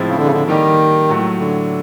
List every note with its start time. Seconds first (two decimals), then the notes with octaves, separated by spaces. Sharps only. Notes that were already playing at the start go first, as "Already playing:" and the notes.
Already playing: A2 F3 G#3 C4 E4
0.08 C#3
0.17 D3
0.26 C#3
0.33 D3
0.47 D#3 G3 A#3 D#4 G4
1.09 A2 F#3 A3
1.39 D3